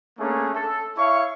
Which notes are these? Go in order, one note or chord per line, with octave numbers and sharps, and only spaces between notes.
A3 A#3 C#4 D4 G#4
A4
E4 C#5 E5 F5 C#6